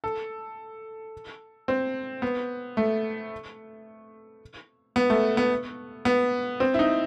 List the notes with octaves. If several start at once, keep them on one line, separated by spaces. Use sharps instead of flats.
A4
C4
B3
A3
B3
A3
B3
B3
C4
E4
D#4